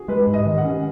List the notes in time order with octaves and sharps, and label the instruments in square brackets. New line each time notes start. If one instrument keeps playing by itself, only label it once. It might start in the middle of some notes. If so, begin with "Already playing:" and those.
Already playing: [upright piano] F#4 G#4
[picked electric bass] G#3 [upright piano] B4
[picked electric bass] G#2
[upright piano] D#5
[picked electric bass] D#3
[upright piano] F#5
[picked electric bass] C#4